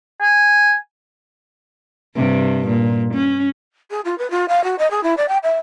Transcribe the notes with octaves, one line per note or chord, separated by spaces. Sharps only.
G#5
G2 C3
A#2
C#4
G#4
F4
B4
F4
F5
F#4
D#5
G#4
E4
D5
G5
E5